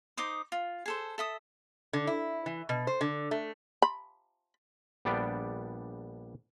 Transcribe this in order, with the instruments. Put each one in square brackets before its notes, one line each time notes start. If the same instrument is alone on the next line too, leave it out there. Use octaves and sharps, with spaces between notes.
[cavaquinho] D#4 C5 D6 D#6
F4
G#4 A4 C5
A4 E5 D#6
[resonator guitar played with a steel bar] D3
E4
E3
B2
C5
D3
A3
[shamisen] B5
[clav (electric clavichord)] A#1 G3 B3 D4 G5